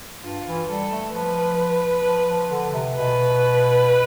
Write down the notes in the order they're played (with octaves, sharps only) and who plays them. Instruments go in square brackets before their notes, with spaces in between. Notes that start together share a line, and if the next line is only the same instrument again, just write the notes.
[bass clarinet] G2 [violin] F4
[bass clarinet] E3
[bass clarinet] G3 [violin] A4
[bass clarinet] A3
[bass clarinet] F3 [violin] B4
[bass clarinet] F3
F3
D3
C3
[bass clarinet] B2 [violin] B4